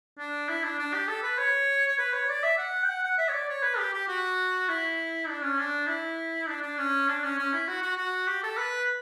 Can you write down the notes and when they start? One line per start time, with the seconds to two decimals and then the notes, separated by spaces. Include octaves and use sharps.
0.18 D4
0.49 E4
0.64 D4
0.79 D4
0.94 G4
1.08 A4
1.23 B4
1.38 C#5
1.88 C#5
1.98 B4
2.13 C#5
2.29 D5
2.43 E5
2.58 F#5
2.83 G5
2.89 F#5
3.03 F#5
3.18 E5
3.29 C#5
3.34 D5
3.49 C#5
3.63 B4
3.78 G4
3.94 G4
4.08 F#4
4.68 E4
5.29 D4
5.43 C#4
5.59 D4
5.87 E4
6.49 D4
6.62 D4
6.78 C#4
7.08 D4
7.23 C#4
7.38 C#4
7.53 E4
7.68 F#4
7.82 F#4
7.97 F#4
8.28 G4
8.43 A4
8.58 B4